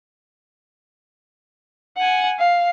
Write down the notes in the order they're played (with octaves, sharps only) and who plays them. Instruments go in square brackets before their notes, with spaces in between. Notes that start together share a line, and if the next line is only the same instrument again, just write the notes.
[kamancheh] F#5 G#5
F5